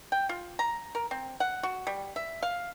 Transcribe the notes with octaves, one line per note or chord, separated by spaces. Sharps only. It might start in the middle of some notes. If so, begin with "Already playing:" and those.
G5
F4
A#5
A#4
C4
F#5
F#4
G3
E5
F5